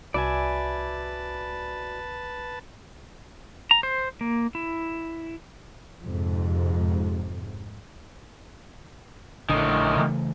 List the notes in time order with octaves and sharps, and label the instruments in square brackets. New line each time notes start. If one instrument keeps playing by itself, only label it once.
[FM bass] C2 [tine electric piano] F#4 B5 [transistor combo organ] B4 A5 [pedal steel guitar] D5 E5 G#5
[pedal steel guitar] A#5
C5
A#3
E4
[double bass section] F2 G#2 C3
[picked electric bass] A#1 D3 [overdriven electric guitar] A2 D#3
[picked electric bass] C#3 E3 A3